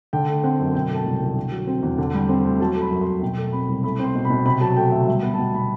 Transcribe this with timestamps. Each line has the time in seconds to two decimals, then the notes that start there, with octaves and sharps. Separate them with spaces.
0.13 D3 G5
0.28 A3
0.44 C4 F#5
0.60 F#2
0.74 B2 G5
0.90 A3
0.95 A5
1.06 C2
1.16 G5
1.21 C2
1.36 D3
1.52 F#3
1.67 C4
1.83 E2
1.98 D3
2.14 G3
2.29 C4
2.44 D2
2.60 F#3 A5
2.75 A3
2.81 B5
2.91 F#2
3.01 C6
3.07 F#2
3.22 B2 G5
3.37 A3
3.52 C4 B5
3.68 C2
3.83 A3 B5
3.99 C4 C6
4.15 B2
4.25 B5
4.30 B2
4.46 C3 B5
4.61 F#3 A5
4.76 A3 G5
4.92 D2 E5
5.08 G3 E5
5.22 B3 F#5
5.34 A5
5.39 B2 G5
5.54 B2 B5